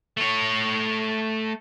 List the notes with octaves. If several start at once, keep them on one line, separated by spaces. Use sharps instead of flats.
A3 C#5